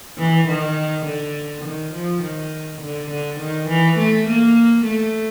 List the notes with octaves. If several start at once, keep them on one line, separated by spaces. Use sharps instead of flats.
E3
D#3
D3
D#3
F3
D#3
D3
D3
D#3
E3
A3
A#3
A3